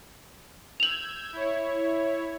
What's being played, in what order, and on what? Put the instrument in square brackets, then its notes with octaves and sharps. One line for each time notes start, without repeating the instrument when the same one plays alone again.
[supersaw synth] E6 G6 G#6 [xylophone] F7 F#7
[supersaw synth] E4 C#5